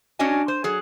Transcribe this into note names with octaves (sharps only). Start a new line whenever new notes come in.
C#4 D4 F#4 C#5 D#5 G#5
C5
F#3 G#4